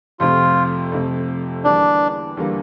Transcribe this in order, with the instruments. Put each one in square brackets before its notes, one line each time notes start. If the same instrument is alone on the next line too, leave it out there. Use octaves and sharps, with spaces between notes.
[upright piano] F2 C3 F3 A3 C4 [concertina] F4
[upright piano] F2 C3 F3 A3 C4
[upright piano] E2 D3 G3 A#3 [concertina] D4
[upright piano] E2 D3 G3 A#3